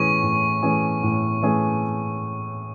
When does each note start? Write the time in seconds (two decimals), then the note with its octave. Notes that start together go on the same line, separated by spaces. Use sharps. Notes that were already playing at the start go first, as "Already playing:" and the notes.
Already playing: A2 E3 A3 C#4 G#4 C#6
0.22 A2
0.62 E3 A3 C#4 G#4
1.03 A2
1.42 E3 A3 C#4 G#4